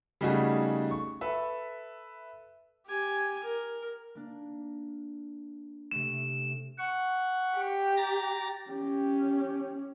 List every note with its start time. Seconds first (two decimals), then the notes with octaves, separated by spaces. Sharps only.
0.21 C#3 G3 A3 D#4 F#4 G#4
0.91 C#6
1.21 A4 B4 E5
2.86 G4 G#5
3.44 A#4
4.15 A#3 D4
5.91 C3 A3 E7
6.78 F#5 C#6
7.56 G4
7.97 A#5 A6 A#6
8.70 C#4 G4